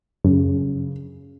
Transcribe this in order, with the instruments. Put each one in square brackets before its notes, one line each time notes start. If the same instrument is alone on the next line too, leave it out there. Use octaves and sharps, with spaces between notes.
[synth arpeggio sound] F#2 [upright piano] C#3